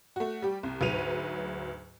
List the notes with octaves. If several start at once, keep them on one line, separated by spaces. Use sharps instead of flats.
A3 F#4
G3 G4
C2
D2 G#2 F#3 B4 D#7 F7